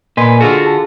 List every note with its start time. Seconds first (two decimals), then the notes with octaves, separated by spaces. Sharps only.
0.17 A#2 B4 D#5 G#5 C6
0.40 D3 F4 F#4 G#4 A4
0.65 G#4 A5